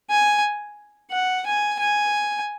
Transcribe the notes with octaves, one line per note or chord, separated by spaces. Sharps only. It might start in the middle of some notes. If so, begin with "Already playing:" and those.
G#5
F#5
G#5
G#5